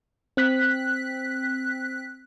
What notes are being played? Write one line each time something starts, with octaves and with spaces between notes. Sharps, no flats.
C4 F#6 B6